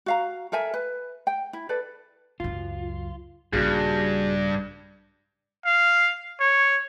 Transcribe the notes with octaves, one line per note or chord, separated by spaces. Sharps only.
F#4 F5 A#5
A4 A#4 E5 G#5
B4
G5
E4
A4 B4 D5
C#2 F#2 F4
A#1 G2 C#3 F#4 G#4
F5
C#5